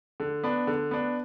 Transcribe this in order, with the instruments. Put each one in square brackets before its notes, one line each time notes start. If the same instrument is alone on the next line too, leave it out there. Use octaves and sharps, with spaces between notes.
[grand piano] D3
B3 D4
D3
B3 D4